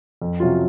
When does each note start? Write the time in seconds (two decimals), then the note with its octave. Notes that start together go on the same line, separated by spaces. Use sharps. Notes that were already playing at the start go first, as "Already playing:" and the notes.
0.22 F2
0.40 C3 F#3 C#4 F4